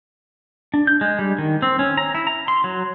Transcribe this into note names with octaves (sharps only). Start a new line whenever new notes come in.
D4
G6
G#3
G3
D#3
C4
C#4
A#5
E4
A#5
C6
F#3